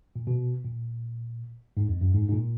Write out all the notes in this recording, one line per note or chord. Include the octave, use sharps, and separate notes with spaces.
A#2
B2
A#2
G#2
F2
F#2
G#2
G#2
A#2